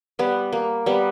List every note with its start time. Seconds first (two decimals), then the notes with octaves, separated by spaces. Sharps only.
0.19 G3 B3
0.52 A#3
0.86 G3 B3